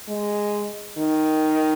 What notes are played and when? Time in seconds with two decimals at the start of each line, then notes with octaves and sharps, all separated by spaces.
0.09 G#3
0.98 D#3